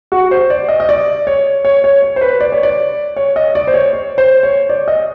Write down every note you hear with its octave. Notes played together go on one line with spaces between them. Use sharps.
F#4
C5
D5
D#5
D#5
D5
C#5
C#5
C#5
C#5
C5
B4
D5
C#5
D5
C#5
D#5
D5
C5
C#5
C#5
C5
C#5
D5
D#5